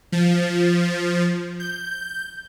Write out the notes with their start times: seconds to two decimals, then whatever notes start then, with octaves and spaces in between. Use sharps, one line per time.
0.12 F3
1.60 G6